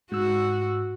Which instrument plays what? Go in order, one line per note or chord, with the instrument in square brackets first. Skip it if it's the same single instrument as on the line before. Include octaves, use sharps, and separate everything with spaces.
[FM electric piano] G#2 E6 [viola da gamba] F#4